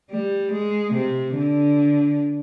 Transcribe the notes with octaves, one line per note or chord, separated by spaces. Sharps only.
G3
G#3
C3
D3